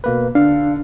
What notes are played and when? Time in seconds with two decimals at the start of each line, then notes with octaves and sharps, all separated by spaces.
0.04 B2 A#3 B4
0.35 D3 D4 F5